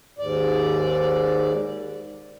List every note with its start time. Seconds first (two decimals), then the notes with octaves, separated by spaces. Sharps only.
0.19 D#2 G#2 D5